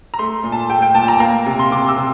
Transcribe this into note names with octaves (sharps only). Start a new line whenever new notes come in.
A#5
A3 C6
A#2
A5
A3 G5
G5
A#2 A5
A#5
A#3 A#5
C3
C6
C3 D6
E6
C3